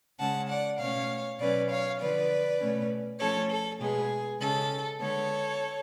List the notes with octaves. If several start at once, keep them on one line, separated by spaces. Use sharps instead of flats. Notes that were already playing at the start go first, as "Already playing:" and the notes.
C#3 G#3 C#4 F#5 A5
D5 F#5
B2 A3 C#4 C#5 F5
B2 F#3 C#4 B4 D5
C#5 F5
D3 F3 B3 B4 D5
B2 A3 C#4
F3 A3 C#4 A4 C#5
A4
B2 G#3 B3 G#4
C#3 G#3 C#4 A4
D3 G#3 B3 A4 C#5